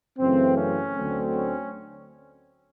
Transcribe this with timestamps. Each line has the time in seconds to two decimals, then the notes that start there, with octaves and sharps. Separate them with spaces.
0.19 F#2 C#3 E3 A3 C4
0.57 C#4
0.96 D2 D3 F#3 A3 C4
1.34 C#4